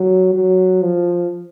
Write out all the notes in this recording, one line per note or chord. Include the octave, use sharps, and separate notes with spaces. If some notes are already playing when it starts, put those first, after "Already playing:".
Already playing: F#3
F#3
F3